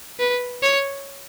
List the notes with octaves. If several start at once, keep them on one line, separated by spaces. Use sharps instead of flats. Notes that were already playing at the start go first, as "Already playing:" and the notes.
B4
C#5